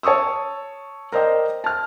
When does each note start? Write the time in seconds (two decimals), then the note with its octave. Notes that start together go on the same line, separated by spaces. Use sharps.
0.03 C#5 A5 C#6 D#6 E6
1.12 A#4 C5 D5 D#5 G5
1.64 A5 F6